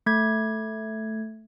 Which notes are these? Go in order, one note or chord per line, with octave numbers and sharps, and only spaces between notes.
A3 G#6